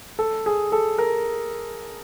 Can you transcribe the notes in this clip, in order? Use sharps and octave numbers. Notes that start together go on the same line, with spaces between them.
A4
G#4
A4
A#4